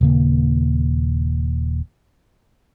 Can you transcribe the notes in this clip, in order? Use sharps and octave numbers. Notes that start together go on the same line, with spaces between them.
D#1 C#3 A#3